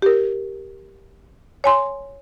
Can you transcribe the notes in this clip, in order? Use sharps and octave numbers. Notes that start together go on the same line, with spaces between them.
G4 A#4
C#5 G#5 C6